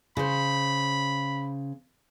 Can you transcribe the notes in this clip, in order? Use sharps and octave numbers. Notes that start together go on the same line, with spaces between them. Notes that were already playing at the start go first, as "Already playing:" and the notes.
C#3 C5 B5